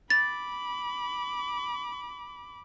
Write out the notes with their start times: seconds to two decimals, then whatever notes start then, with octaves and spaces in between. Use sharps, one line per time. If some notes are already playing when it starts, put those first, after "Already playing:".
0.10 B5 D6 A6